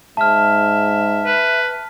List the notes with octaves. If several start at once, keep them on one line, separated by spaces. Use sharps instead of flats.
G#2 E5 A5 F6
B4